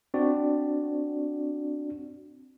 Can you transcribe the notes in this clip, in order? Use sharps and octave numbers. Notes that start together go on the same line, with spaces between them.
C4 D4 F#4 D5